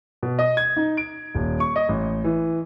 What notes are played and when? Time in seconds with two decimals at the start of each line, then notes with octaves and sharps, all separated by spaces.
0.23 B2
0.39 D#5
0.57 G#6
0.77 D#4
0.97 D7
1.35 D#1
1.60 C#6
1.76 D#5
1.89 A1
2.24 E3